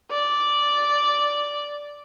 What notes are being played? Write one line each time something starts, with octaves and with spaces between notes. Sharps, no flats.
D5